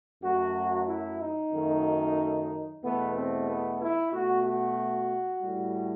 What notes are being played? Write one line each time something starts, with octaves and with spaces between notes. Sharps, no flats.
F#2 F#3 A3 F#4
E4
D#4
F#2 D#3 F#3 A3
E2 B2 A3 B3
C4
B3
E4
B2 A3 F#4
F#4
A2 G3